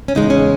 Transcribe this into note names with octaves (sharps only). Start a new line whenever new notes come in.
C#4
E2 C#3 G#3 D#4
C#4